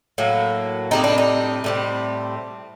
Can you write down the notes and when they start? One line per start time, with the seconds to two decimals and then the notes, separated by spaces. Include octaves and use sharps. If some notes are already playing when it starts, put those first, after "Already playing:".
0.18 A2 F#3 A#3
0.91 A2 G3 C4 D#4
1.04 D4
1.18 D#4
1.64 A2 G3 C4